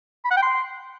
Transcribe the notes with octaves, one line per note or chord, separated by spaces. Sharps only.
B5
F#5
G5
C6